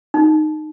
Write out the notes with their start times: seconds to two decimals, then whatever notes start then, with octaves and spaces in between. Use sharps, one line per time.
0.14 D#4